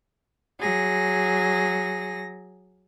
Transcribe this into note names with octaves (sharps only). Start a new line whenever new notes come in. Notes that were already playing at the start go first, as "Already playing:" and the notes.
F#3 G#4 A#6